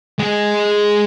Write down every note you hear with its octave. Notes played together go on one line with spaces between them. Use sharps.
G#3 G#4